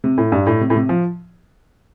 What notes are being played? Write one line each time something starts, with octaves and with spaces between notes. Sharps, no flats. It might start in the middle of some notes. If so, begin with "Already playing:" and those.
C3
A2
G2
A2
C3
A2
C3
F3